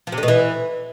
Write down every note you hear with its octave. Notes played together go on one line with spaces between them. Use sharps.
F3
C3
D3
B2
E3